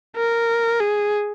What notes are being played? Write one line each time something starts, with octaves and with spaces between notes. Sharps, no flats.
A#4
G#4